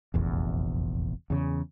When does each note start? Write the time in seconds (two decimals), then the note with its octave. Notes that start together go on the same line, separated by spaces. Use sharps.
0.14 F1 A#1 E2
1.30 E2 C#3